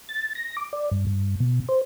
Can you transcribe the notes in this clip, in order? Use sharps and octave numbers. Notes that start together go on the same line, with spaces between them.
A6
A#6
D6
D5
G2
G2
B2
C5